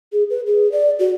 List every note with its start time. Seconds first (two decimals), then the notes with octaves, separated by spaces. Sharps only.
0.12 G#4
0.30 B4
0.47 G#4
0.72 D5
0.99 F#4